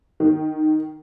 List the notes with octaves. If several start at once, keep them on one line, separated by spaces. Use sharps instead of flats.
D#3